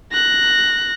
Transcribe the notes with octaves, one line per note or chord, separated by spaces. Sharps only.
F#6 A#6